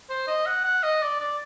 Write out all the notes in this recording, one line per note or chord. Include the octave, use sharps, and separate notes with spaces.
C5
D#5
F#5
F#5
D#5
D5
D5